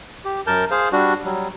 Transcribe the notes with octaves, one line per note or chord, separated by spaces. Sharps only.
G4
F#2 A#4 A5 G6
G#4 C5 F5
G3 D4 F#4
F#3 G3